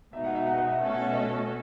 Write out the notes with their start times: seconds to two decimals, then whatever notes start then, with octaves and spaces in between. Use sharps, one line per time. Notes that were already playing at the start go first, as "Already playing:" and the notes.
0.13 B2 G#3 D#4 E5
0.24 F#5
0.35 E5
0.46 F#5
0.58 F#5
0.69 E5
0.80 B2 A3 C#4 F#4 A4 E5
0.92 F#5
1.03 E5
1.14 D#5